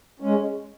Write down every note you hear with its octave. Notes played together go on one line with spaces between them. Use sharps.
G#3 C#4